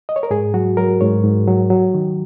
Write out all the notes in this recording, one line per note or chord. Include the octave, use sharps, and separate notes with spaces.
D#5
C#5
A#4
G#2 G#4
F#3 F#4
F#3 A#4
G#2 C#5
G#2
F#3
F#3
D#3